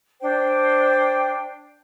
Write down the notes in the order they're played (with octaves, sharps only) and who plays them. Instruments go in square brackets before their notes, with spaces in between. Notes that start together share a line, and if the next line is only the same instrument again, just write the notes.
[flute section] D4 C5 G5